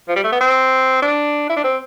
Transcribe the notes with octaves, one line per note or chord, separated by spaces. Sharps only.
F3
G3
A3
B3
C4
D4
E4
D4
C4